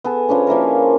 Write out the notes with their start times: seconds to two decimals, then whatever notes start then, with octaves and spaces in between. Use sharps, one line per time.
0.04 B3 G#4 A4
0.29 F3 B3 C#4 D4
0.47 F3 A#3 E4 A#4